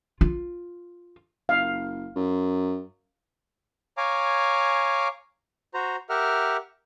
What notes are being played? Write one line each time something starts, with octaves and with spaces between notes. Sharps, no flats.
F4
F#1 F5
F#2
C#5 F5 G#5 A#5 D6
F#4 C5 A#5
G4 A#4 E5 F#5 F6